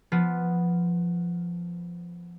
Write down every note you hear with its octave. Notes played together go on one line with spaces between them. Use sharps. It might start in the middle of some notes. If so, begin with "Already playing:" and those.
F3 B3